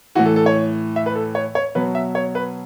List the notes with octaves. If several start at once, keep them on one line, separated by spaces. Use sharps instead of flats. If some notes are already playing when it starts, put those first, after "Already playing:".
A2 E3 F#4
A4
A4
C#5
E5
B4
A4
C#5
C#5
B2 F#3 B4
E5
C#5
B4